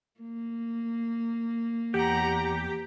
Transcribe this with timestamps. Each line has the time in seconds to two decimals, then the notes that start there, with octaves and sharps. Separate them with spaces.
0.20 A#3
1.94 E2 G4 F#5 A#5